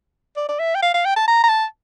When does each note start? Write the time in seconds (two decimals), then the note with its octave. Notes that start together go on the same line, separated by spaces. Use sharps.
0.37 D5
0.48 D5
0.59 E5
0.75 G5
0.82 F5
0.94 F5
1.05 G5
1.16 A5
1.28 A#5
1.44 A#5
1.49 A5